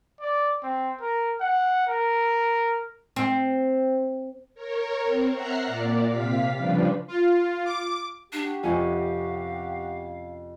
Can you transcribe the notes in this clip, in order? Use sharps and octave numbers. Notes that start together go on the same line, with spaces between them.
D5
C4
A#4
F#5
A#4
C4
A#4 C#5
C4
E5 F#5 A#5 F6 F#6 C7
A#2 D5
C3 F5 B6
C#3 F3 G3 D4 B4
F4
D6
D4 F#4 G4
F2 C3 C#4 F5 G#5